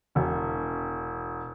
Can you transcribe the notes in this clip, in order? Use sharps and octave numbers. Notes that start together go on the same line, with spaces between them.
E1 F#4